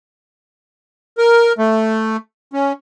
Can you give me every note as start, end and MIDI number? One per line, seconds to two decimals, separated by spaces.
1.18 1.53 70
1.58 2.17 57
2.53 2.73 61